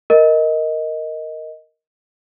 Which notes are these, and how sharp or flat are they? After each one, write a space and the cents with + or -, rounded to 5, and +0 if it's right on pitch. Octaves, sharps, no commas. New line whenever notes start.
A#4 +0 D#5 +10